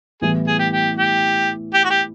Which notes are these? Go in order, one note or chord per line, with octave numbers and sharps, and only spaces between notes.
A2 E3 G3 B3 E4 G#4
G#4
G4
G4
G4
G4
F#4
G4